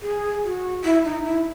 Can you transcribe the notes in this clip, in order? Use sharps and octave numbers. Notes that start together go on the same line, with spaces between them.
G#4
F#4
E4
D#4
E4